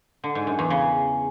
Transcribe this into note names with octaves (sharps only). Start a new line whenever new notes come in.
D3
G#2
F#2
E2
C#3